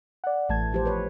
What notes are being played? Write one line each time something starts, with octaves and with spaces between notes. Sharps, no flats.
D5 F#5
A1 E3 A3 A5 G#6
F3 G4 C5
B4 C#5